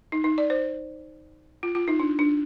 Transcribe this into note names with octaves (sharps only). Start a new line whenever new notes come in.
D#4
D#4
D5
C5
F4
F4
D#4
D4
D4